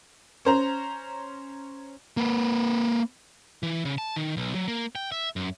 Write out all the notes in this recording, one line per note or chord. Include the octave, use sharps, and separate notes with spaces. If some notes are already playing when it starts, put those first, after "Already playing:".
C#4 C5 A#5
A#3 B4
E3
C#3
A5
D#3
B1
F#3
A#3
G5
E5
F#2